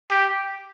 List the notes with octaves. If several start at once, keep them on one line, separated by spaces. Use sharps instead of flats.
G4